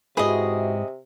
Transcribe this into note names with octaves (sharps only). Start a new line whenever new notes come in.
G#2 C3 E4 F#4 G#4 B4 D#5